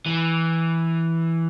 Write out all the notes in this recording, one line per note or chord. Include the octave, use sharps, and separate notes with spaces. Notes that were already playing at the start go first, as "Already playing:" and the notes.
E3